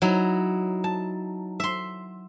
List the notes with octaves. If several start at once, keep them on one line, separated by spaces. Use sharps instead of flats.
F#3 D#4 E4
A5
E5 C6